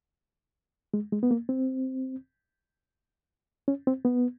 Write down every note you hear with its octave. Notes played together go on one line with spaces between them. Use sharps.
G#3
G#3
B3
A#3
C4
C#4
C4
B3